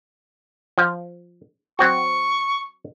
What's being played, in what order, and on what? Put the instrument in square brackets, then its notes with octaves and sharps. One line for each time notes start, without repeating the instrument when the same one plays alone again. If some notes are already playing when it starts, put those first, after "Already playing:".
[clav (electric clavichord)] F3
[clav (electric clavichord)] F#3 C4 F#4 [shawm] C#6